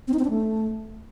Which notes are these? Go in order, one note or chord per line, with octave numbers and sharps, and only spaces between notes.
C4
D#4
C4
D4
A3